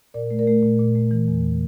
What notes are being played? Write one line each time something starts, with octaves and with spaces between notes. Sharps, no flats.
A#2 A#4 D5
A3
A#4 D5
A3
A#2
A#2
A3
E3
E2